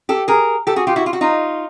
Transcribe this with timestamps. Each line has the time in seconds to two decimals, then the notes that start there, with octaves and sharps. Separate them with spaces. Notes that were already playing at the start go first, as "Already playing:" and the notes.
0.09 G4 A4
0.28 G#4 A#4
0.67 G4 A4
0.76 F#4 G#4
0.87 F4 G4
0.96 E4 F#4
1.06 F4
1.13 F#4
1.21 D#4 F4